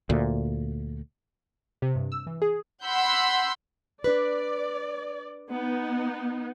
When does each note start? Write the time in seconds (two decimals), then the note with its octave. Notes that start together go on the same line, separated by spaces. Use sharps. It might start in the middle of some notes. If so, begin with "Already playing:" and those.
0.10 D2 A#2
1.82 C3
1.95 G2
2.12 E6
2.27 E3
2.42 G#4
2.85 F#5 B5 C6 E6 G6
4.04 D4 B4 D5
5.50 B3 D#4